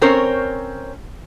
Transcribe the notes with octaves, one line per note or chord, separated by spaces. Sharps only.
C4 C#4 A#4 C5 C#5